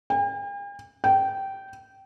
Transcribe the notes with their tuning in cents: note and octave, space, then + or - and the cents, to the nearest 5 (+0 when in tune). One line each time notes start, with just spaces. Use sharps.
G5 +45
G5 -15